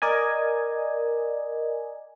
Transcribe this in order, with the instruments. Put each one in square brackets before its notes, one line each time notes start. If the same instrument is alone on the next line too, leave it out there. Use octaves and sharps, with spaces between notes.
[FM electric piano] A#4 D5 D#5 G#5